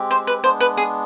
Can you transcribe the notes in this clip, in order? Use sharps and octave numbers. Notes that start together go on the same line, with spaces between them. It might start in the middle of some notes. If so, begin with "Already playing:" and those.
Already playing: G#3 C4 G4
C5
B4
G#3 B3 D4 C5
B4
G#4